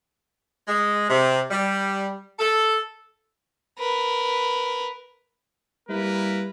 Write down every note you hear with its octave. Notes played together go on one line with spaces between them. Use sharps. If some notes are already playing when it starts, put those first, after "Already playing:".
G#3
C3
G3
A4
A#4 B4
G3 A#3 E4 A#4 B4